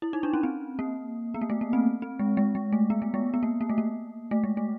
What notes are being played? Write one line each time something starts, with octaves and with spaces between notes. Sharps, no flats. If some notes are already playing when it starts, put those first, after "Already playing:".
E4
D#4
D4
C#4
C4
A#3
B3
A#3
A3
A#3
C4
C4
G#3
G#3
G#3
A3
B3
A3
G#3
B3
A#3
A#3
A3
A#3
A3
G#3
A3